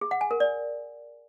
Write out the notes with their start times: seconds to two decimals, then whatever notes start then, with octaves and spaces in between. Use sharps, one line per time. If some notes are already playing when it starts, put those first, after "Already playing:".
0.01 G#4
0.11 F#5
0.21 G#5
0.31 A#4
0.40 D5